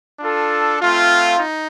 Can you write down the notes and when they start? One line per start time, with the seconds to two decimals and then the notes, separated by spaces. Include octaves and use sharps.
0.20 D4 F4 A4
0.80 A3 C4 F4
1.39 D#4